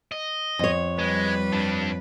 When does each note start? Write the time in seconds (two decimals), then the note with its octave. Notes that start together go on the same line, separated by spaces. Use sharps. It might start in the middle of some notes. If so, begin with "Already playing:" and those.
0.12 D#5
0.59 F2 C#5
0.99 G3 G#3 B4
1.53 G2 D4